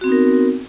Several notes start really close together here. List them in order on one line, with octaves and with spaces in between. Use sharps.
F#4 C4 B3 D#4 A#4